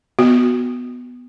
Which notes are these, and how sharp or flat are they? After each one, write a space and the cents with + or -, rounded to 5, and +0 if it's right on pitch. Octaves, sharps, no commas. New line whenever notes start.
B3 +0 F#4 +0